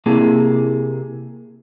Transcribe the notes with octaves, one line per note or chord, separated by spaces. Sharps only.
C3 A#3 E4 G#4 A5